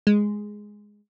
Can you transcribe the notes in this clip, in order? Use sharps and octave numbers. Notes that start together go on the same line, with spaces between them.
G#3